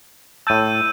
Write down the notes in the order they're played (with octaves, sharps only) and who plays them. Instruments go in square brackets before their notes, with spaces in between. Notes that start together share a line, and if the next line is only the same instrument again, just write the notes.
[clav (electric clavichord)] A2 A5 [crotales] E6 G6 D#7